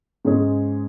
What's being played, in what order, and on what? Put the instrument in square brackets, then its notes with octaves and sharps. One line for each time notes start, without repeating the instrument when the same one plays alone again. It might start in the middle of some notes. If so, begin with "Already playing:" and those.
[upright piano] G#2 G#3 C#4 G#4